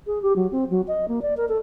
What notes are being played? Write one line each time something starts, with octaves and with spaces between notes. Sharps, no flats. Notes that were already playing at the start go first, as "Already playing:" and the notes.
G#4
G4
F#3
C4
F#3
D#5
A#3
D5
A#4
A4